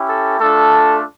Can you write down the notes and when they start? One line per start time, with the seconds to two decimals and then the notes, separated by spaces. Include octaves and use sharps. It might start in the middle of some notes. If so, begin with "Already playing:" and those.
Already playing: C#4 E4 G4
0.09 A4
0.40 A3 D4 F4 A4